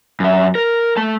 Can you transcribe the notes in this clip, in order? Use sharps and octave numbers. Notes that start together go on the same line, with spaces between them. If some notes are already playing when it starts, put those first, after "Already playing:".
F#2 E5
A#4
A3 A5